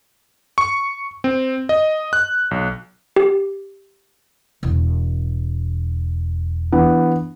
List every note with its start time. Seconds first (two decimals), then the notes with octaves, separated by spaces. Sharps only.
0.58 C#6
1.24 C4
1.69 D#5
2.13 F#6
2.51 B1
3.16 G4
4.63 E1
6.72 E3 B3 D4